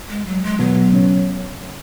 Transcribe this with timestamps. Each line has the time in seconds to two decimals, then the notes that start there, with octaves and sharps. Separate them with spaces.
0.09 G#3
0.26 F#3
0.43 G#3
0.59 B2 F#3 B3
0.92 C#3 C#4